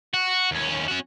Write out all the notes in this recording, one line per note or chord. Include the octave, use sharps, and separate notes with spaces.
F#4
D#2 C#4
C#4 F#4